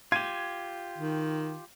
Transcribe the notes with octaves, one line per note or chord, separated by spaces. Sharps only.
F4 G4 G#6 D#7
D#3